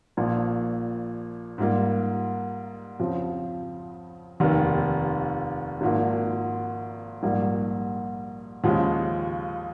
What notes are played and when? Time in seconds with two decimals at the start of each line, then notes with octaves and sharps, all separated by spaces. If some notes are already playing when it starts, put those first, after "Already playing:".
0.17 A#1 A#2 F3
1.58 G#2 G3 A#3 F4
3.00 F2 C#3 F3 C4
4.40 F1 D#2 D#3
5.81 G#1 G#2 F3 A#3
7.23 A#1 G#2 G3 A#3
8.64 D#2 C#3 F3 G#3